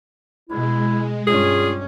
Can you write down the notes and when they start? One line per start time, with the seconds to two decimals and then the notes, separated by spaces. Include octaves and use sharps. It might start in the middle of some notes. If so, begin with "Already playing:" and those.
0.50 B2 G#3 E4
1.27 G2 C#4 F4 G#4